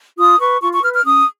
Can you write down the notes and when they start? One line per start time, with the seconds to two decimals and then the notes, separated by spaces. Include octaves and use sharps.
0.18 F4 D#6
0.40 B4 C#6
0.62 F4 C#6
0.73 C#6
0.83 B4 F6
0.94 F6
1.05 C#4 D#6